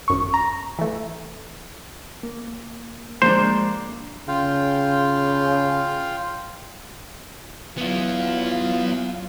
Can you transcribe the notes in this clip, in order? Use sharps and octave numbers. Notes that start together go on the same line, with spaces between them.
G#1 F#2 C#6
A#5
E3 A3
A#3
F3 G#3 A#3 D4 C5
C#3 F4 F5 G5
F#3 B3 E4 F4